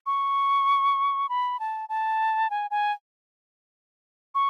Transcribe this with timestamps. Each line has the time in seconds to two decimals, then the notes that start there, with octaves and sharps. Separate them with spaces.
0.06 C#6
1.29 B5
1.60 A5
1.89 A5
2.50 G#5
2.71 G#5
4.35 C#6